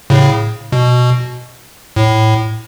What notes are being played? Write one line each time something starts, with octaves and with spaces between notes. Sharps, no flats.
A2 C#3
B2
A2